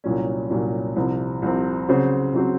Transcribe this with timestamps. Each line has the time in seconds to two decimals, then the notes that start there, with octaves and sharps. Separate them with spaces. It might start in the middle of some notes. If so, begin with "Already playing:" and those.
0.04 C2 A#2 F#3 C#4
0.50 C2 A#2 F#3 C#4
0.96 C2 C3 F3 C4
1.42 C2 C3 F3 C4
1.88 C#3 F#3 C4 F#4 C5
2.34 C#3 F#3 C4 F#4 C5